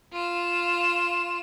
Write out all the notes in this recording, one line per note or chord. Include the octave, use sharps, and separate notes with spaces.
F4 E7